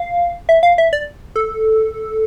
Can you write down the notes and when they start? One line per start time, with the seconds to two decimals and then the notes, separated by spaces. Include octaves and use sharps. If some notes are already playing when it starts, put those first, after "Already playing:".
Already playing: F5
0.49 E5
0.63 F5
0.78 E5
0.93 D5
1.36 A4